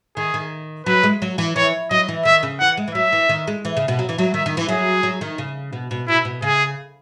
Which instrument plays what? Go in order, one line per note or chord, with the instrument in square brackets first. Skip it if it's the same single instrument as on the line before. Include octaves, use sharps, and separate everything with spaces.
[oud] D#3 [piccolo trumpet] G#4
[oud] D#3
[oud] F#3 [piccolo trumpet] B4
[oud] G#3
F#3
E3
[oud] E3 [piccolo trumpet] C#5
[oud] F#3 [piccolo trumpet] D#5
[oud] E3
[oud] D#3 [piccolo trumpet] E5
[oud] C#3
[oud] E3 [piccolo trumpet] F#5
[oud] G#3
E3
[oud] F#3 [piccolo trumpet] E5
[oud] E3
D#3
G#3
E3
C#3
B2
F#3
E3
F#3
[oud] D#3 [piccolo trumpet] E5
[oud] D#3
E3
[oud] F#3 [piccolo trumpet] G#4
[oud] F#3
D#3
C#3
B2
B2
[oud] B2 [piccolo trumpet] E4
[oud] B2
[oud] C#3 [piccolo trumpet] G#4